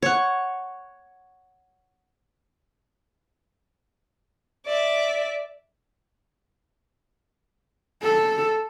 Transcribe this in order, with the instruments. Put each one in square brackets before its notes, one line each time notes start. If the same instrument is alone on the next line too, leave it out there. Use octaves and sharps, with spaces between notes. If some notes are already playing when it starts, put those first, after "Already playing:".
[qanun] C#5 F#5
[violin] D5 E5
[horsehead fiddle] A4